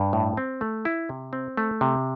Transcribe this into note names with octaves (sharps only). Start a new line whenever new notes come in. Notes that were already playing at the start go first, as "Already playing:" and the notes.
Already playing: G2
A2
C4
A3
E4
C3
C4
A3
C3